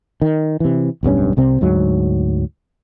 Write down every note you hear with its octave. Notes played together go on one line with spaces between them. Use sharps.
D#3
C3 E3
D1 B1 G2 C#4
C2 C3 C4
D2 G#2 F#3